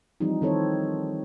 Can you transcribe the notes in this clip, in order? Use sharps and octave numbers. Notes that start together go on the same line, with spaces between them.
E3 F3 G3 C4 D#4
D#3 C4 A4 C5 C#5